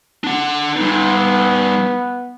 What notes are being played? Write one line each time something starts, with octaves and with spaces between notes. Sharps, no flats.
D4 F#5
G3 B3 D#4